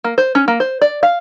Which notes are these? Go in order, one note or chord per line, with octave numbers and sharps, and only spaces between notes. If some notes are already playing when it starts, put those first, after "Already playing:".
A#3
C5
C#4
A#3
C5
D5
F5